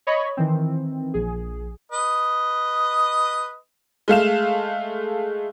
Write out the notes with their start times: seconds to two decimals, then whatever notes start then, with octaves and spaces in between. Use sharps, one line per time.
0.07 C#5 D#5 B5 C#6
0.37 D#3 E3 C4
1.14 A#1 G#4
1.92 B4 D#5
4.08 G#3 A3 F5 E7